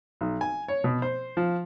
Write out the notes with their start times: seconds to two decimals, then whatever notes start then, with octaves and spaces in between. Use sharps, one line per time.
0.21 B1
0.41 G#5
0.68 C#5
0.84 B2
1.02 C5
1.37 F3